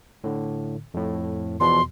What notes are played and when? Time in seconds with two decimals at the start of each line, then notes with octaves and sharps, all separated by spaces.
0.24 A2 D3
0.94 F2 A2
1.60 E2 B2 F3 C6